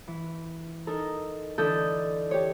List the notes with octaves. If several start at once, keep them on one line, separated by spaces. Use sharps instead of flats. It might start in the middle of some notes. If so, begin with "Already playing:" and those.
E3
D#4 A4 A#4
D3 E3 D4 A4 D#5 G6
G4 C#5